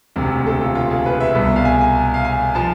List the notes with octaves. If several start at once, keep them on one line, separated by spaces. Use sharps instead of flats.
E1 D2 C3
A4
F4
F4
G#4
B4
E5
C2 B2
F5
G#5
G#5
F5
G#5
F3 A5